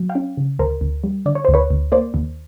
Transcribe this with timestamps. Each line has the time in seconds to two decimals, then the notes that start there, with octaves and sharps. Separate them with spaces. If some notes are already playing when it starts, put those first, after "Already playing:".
Already playing: F#3
0.09 F5 G5
0.15 C#4
0.37 C#3
0.59 D2 A#4 C5
0.81 D2
1.04 G3
1.26 D3 D5
1.35 C#5
1.45 D2 C5
1.54 B4 C#5
1.71 D2
1.92 A#3 C5 D5
2.14 D#2